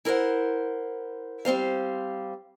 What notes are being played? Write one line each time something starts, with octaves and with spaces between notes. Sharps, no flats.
E4 A#4 C5 F#5
G3 C4 C5 F5